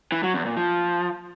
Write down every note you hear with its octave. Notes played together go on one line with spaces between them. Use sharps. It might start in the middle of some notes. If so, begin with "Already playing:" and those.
E3
F#3
E2
A#2
F3